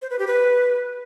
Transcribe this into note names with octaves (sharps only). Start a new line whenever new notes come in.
C5
B4
G4
B4